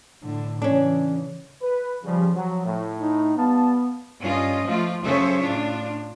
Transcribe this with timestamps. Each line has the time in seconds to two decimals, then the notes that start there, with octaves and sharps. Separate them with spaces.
0.23 A2 D3
0.62 C#3 E3 C#4 D4
1.61 B4
2.03 C#3 F3 G3
2.35 F3 F#3
2.65 A2
2.98 D#4
3.37 G3 B3 F5 A5
4.21 G2 C#4 F4 D#5
4.67 F3 A3 F4
5.05 F#2 C#3 A4 C5 C#5 E5
5.41 A2 D4 F4